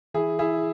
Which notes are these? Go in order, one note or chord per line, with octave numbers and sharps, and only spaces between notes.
E3 E4 G#4
E4 G#4